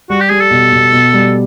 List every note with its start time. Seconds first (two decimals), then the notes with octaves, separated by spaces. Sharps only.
0.09 G3 F#4
0.20 G4
0.30 G3 G#4
0.41 A4
0.51 B2
0.72 B2
0.92 B2
1.13 G3